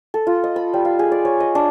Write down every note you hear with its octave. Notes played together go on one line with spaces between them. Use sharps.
A4
F4
D#5
B5
G3
F5
G#4
D5
C#5
D#5
D4